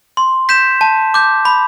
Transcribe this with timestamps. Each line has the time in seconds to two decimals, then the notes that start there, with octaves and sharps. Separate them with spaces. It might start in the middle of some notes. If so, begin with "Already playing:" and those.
0.17 C6
0.49 G6 B6 E7
0.81 A5
1.14 D6 G6
1.45 B5